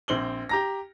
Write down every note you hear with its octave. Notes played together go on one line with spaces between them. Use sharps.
A#1 C4 F#7 G7
G4 A#5 A#6